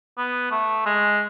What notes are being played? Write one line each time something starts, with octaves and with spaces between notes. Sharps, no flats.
B3
A3
G#3